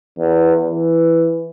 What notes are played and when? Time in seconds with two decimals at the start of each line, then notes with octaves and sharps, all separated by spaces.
0.19 E2
0.65 E3